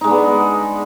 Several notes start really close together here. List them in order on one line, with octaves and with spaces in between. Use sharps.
D#4 G#3 D4 B3